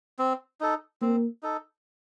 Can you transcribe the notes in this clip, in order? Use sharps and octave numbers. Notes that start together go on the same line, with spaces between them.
C4
D#4 A4
A#3 C4
D#4 A4